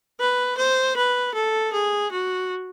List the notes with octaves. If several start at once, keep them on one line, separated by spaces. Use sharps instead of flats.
B4
C5
B4
A4
G#4
F#4